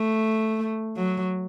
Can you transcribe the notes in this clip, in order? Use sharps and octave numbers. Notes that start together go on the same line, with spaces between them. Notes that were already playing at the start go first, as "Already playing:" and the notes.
Already playing: A3
F#3